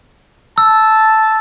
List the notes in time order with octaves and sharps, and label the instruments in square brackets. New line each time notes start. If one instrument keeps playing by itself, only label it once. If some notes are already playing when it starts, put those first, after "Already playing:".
[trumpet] A5 [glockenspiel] E6